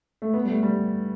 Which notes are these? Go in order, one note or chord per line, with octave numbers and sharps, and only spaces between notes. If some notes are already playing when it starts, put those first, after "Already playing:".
A3
B3
G3
A3
G3